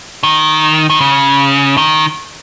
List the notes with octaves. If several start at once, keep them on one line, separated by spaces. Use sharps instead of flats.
D#3
D#3
C#3
D#3